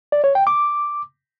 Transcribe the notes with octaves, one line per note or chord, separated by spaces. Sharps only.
D5
C#5
G5
D6